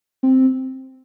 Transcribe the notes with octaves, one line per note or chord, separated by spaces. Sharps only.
C4